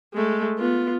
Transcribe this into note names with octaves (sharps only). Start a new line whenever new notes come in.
G#3 A3
B3 F4